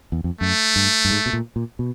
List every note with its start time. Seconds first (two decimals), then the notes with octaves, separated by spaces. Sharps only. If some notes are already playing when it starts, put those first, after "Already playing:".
0.12 E2
0.24 F2
0.40 F#2 A3
0.76 G2
1.05 G2
1.10 G#2
1.26 B2
1.33 A#2
1.56 A#2
1.79 B2